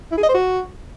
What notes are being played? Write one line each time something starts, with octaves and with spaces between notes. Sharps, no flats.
E4
G#4
D#5
C5
F#4